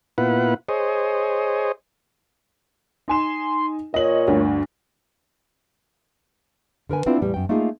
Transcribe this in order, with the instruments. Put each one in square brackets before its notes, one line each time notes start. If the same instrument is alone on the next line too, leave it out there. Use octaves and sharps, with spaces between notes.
[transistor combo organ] A#2 B3 E4 F4 B4 F#5
G#4 C5 C#5 D#5
[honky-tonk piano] D#4 G#5 E7 [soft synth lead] C6
[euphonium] A#2 [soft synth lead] C#5 [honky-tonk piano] D#5 F#7
[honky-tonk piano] D2 [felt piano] G2
[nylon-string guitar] D3 A#4 B4 G#5
B3 C4 D4 E4 F4
E2 A2 G3
F#2 G5
A3 A#3 D#4 F4 G#4